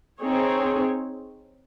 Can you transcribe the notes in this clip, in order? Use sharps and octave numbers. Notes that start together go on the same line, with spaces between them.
C4 D#4 G#4 C#5